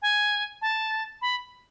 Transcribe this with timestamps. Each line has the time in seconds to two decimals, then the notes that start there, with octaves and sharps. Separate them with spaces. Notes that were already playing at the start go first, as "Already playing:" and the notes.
0.02 G#5
0.62 A5
1.22 B5